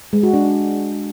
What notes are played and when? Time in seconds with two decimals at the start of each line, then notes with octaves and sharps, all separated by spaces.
0.13 G#3
0.23 F#4
0.34 D4